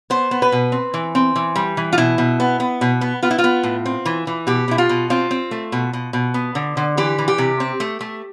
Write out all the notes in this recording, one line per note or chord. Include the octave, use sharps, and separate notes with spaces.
B3 C5
B3
B4
B2
C4
E3
C4
E3
G3
E3
F4
B2 E4
B2
B3
B3
B2
B3
B3 F4
E4
F4
B3
A2
C4
E3
E3
B2 G4
B2 E4
F4
B2
C4 F4
C4
A3
B2
B2
B2
B3
D3
D3
E3 G4
E3
G4
C3
C4
A3
A3